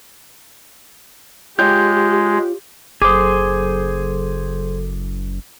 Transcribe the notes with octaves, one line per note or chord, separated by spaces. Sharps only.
G#3 F4 G4 C#5 G5 G6
F#1 F#3 G#4 A4 C5 D6 D#6